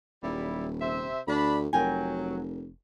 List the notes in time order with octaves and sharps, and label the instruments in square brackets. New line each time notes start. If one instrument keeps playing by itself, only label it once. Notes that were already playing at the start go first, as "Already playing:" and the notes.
[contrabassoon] D#1 [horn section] F#3 G3 E4
[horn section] C3 C5 E5
[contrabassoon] D2 [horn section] D4 B5
[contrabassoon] F1 [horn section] F#3 [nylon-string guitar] A#4 G5 G#5